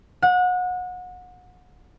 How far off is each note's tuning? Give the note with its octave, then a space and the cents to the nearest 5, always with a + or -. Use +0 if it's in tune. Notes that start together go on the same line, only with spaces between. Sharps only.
F#5 -30